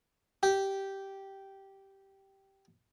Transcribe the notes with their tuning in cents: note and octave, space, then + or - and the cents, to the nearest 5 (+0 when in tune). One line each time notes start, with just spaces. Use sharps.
G4 -10